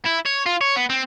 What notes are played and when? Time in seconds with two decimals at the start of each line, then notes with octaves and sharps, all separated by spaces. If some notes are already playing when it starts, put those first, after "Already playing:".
0.05 E4
0.25 C#5
0.46 F4
0.61 C#5
0.76 B3
0.90 C4